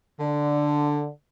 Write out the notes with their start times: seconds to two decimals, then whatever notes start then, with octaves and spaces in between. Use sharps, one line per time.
0.20 D3